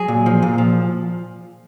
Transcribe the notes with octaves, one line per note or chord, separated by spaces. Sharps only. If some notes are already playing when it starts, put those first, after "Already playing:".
Already playing: F#3 G#4
A#2
F3
A#2
F3